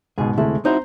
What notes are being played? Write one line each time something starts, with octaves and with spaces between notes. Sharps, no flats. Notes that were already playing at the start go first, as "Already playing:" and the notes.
C#2 G#2 B2 G#4
D2 C3 G#3 A3 E4
C4 D#4 E4 F#4 C5 A#5